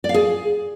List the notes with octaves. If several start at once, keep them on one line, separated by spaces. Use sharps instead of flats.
D5
F5
G#4